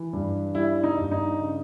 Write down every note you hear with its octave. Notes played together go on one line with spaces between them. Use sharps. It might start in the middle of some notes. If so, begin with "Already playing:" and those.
Already playing: E3
G2
G3 E4
D#4
G2
D#4
C#3